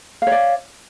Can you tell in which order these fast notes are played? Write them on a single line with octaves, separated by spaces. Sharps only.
F5 C#5 D5